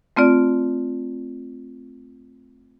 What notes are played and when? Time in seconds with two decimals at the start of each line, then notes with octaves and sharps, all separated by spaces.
0.17 A3 C4 F4 D5